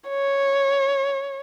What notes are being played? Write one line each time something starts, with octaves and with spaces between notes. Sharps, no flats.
C#5